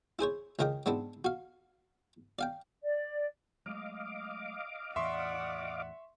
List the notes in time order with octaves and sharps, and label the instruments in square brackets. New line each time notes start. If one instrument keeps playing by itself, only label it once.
[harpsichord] E4 G#4 C5 C#5
C#2 C#3 A#4 D#5 G5 D6
G#2 B3 C4 D4 E4
F#4 F5
D5 F5 G5
[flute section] D5
[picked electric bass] F#3 G#3 A3 [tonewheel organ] D#5 F5 D6
[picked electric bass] E2 A2 E3 [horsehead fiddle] D5 F#5 [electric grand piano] E5 C6 C#6